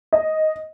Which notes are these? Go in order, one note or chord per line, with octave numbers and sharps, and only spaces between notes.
D#5